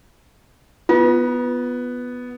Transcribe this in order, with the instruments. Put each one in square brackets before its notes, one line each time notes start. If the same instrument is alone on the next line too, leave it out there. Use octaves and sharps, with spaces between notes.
[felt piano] B3 [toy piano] F4